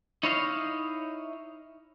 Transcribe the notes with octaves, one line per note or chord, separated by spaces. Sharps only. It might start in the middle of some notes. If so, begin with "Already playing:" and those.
D#4 E4 C#5 D#5 F5